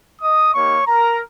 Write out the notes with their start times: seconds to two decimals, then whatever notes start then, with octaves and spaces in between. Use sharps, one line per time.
0.22 D#5 D#6
0.54 A#3 D#4 G4 C#5 C#6
0.87 A#4 A#5